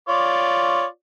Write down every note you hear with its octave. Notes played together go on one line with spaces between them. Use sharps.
F4 C#5 D5